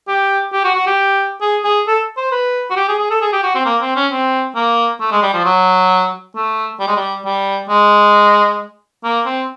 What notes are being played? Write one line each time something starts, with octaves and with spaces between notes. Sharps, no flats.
G4
G4
F#4
F#4
G4
G#4
G#4
A4
C5
B4
F#4
G4
G#4
G#4
A4
G#4
G4
F#4
C4
A#3
C4
C#4
C4
A#3
A3
G#3
G3
F3
F#3
A3
G3
G#3
G3
G3
G#3
A#3
C4